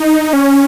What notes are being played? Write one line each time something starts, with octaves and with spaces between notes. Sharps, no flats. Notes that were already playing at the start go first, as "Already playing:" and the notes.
Already playing: D#4
C#4